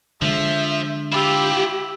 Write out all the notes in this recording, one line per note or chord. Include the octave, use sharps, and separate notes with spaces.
D3 F3 G#3 E5
E4 F4 G4 B5 D6 E6